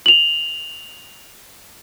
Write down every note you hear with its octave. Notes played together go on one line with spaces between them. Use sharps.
F7 F#7